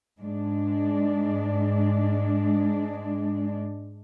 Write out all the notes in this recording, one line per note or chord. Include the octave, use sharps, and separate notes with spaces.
G#2 G#3 D4